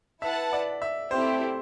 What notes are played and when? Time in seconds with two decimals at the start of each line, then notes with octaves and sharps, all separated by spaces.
0.22 E4 B4 E5 F#5 A5
0.53 D5
0.82 E5
1.11 A3 C4 E4 G4 C5